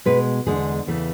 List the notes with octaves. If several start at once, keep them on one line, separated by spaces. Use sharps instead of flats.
B2 G#3 B4
E2 D3 G#3 G#4
E2 C#3 E3 A3